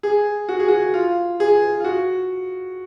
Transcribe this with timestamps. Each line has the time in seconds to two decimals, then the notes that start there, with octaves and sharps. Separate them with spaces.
0.03 G#4
0.49 F#4
0.59 G#4
0.68 F#4
0.94 F4
1.40 G#4
1.80 F4
1.85 F#4